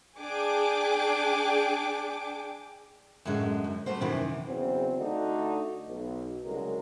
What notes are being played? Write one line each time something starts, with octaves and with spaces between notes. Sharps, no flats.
D4 G#4 G5 D6 D7
F#2 A2 D3 F#3 G#3
F#2
G3 A3 B3 F#4 C5
F#2 C3 D#3 E3
E2 C#3 F#3 C4
D3 A3 D4 D#4 F#4
B1
C2 C#3 F#3 G#3 A#4